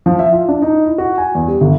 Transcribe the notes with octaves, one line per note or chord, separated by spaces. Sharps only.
F3
E5
F4
D4
D#4
E4
F#4
G#5
E2
G3
G1